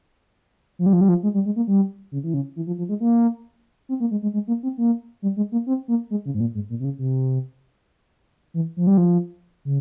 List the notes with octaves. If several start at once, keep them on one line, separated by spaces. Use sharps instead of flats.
F3
G3
F3
G3
F3
G#3
G3
G#3
A#3
G3
C#3
E3
C#3
E3
F3
F3
G#3
A#3
C4
A#3
G#3
G#3
G#3
A#3
C4
A#3
G3
G#3
A#3
C4
A#3
G#3
C#3
G#2
A#2
G#2
A#2
C3
C#3
C3
E3
F3
G3
F3
C#3